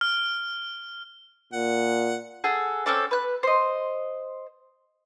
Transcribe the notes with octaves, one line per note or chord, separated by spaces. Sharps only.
F6
A#2 F#5
G#4 A4 F#5
C4 C#4 A4 D5
B4 F#6
C5 D#5